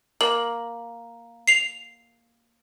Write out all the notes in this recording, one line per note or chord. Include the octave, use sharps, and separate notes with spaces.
A#3 F#7
C7 F7